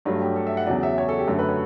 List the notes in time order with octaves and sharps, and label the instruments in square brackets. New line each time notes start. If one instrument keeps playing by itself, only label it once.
[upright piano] G2 F#3 A3
G4
A4
E5
F#5
E2 C#3 F#3 D5
E5
C#5
A4
G4
F#2 D3 A3 A4
B4
C#5